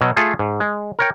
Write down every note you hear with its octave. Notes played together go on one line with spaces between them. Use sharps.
B2 F#3
A3 F4 G#4 A4
G#2
G#3
A#4 C#5 G5